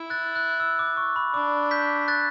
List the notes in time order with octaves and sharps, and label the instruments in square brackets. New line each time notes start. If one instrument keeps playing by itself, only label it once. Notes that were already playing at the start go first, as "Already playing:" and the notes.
Already playing: [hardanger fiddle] E4
[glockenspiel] F#6 A6
F#6
E6
D6
C#6
B5
[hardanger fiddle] D4 [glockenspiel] D6
[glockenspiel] G6 B6
F#6 A6